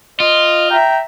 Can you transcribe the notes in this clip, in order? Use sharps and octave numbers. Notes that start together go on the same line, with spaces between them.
F4 D#5
E5 G5 A#5